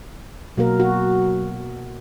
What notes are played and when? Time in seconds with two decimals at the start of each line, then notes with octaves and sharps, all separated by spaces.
0.58 B2 F#3 A#3 A#4
0.80 F#4